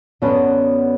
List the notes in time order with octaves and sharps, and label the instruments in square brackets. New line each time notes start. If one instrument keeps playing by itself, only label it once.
[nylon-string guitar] F#2 D3 F#3 C#4 F#4 [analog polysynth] B3